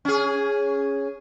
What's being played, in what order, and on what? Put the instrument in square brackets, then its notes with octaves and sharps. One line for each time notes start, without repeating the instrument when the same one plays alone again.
[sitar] C#4 G#4